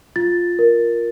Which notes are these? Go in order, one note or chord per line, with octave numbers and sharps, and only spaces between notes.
F4 A6
A#4